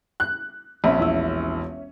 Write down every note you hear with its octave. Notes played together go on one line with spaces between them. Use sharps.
F#6
A#1 C4 C#4 E5 B5
E1 E4 E6